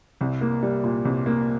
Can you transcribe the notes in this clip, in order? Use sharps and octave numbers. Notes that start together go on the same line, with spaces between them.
C2
A#3
G3
A#2
C2
A#3